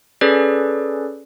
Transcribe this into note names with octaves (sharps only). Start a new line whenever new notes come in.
C#4 G#4 A4 B4 D5